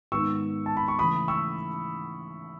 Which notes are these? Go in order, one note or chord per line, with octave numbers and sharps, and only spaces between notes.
G#2 D#3 G#3 B3 C#6 E6
A5
B5
C#6
C#3 E3 A3 B5 D#6
C#6 E6